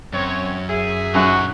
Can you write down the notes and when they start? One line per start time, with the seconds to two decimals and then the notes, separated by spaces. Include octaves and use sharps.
0.13 F#2 C4 C#5
0.68 G#4 E5
1.15 F#2 D#4 F#4 F#5